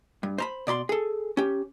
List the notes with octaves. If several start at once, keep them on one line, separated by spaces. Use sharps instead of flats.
G2
C5 A#5 B5
B2 D5 B5 C6
G#4 A4
C#4 G4